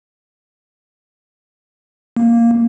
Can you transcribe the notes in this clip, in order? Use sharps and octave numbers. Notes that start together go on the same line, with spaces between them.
A#3